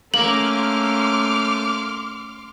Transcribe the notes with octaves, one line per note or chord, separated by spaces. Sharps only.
A3 A#3 C#4 C6 D6 F6 F#7